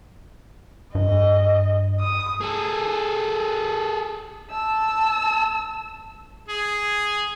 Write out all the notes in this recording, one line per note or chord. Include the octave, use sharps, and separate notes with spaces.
G2 D#5
D#6
G#4 A4
A5 E6
G#4